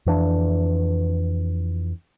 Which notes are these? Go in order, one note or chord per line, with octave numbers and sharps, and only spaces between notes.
F2 E3 D4